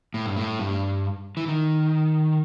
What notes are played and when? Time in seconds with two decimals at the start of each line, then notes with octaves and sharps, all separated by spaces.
0.14 A2
0.26 G2
0.36 A2
0.59 G2
1.37 E3
1.48 D#3